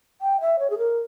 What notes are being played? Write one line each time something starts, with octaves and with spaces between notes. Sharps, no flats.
G5
E5
C#5
G#4
A#4